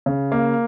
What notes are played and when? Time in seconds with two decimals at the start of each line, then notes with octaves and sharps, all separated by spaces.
0.06 C#3
0.32 A#3